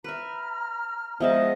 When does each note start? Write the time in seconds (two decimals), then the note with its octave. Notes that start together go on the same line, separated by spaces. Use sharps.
0.04 B4 E5 A#5 F6
1.20 F3 G#3 B3 G#4 D#5 E5 A5